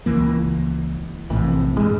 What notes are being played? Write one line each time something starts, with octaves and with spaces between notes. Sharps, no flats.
C#2 E3 A#3
A#1 A2 C3 E3
G2 G#3